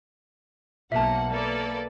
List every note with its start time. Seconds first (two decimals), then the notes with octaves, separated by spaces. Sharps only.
0.92 B1 A#3 E5 F#5 A5
1.30 A#3 A4 B4 D5